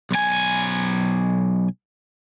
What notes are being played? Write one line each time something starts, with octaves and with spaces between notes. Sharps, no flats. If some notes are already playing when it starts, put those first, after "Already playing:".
B1 G#5